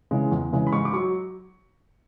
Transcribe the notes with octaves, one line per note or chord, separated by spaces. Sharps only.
C#3 E3 G#3
E2
C#3 E3 G#3
B5
G#2 C#6
D6
F#3 C#6